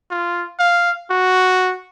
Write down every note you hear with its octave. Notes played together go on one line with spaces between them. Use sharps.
F4
F5
F#4